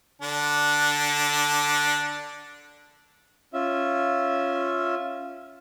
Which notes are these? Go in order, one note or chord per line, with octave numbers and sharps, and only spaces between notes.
D3 D4
C#4 F4 E5